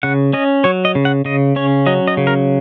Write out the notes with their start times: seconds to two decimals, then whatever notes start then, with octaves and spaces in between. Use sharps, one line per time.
0.03 C#3 F#5
0.33 C#4 D#5
0.64 F#3 C#5
0.85 D#5
0.95 C#3
1.05 F#5
1.25 C#3 D#5
1.56 C#4 C#5
1.86 F#3 D#5
2.08 D#5
2.17 C#3
2.27 A#4